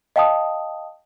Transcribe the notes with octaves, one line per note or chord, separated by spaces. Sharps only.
D#5 F5 G5 A5 D#6